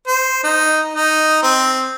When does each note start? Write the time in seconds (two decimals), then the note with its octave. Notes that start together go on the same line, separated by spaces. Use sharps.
0.07 C5
0.44 D#4
0.94 D#4
1.42 C4